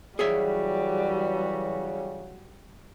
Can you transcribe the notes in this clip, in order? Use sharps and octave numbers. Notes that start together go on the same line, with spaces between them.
C#3 E3 F#3 G3 F#4 G#4 C#5 E5